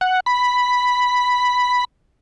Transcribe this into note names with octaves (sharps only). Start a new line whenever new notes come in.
F#5
B5